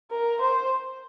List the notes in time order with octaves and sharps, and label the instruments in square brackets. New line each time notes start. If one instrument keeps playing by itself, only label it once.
[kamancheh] A#4
C5